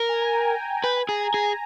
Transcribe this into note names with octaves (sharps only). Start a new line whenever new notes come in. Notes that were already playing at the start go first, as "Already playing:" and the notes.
Already playing: A#4
G#5
A#5
G5
B4 G5
G#5
G#4 A#5
A#5
G#4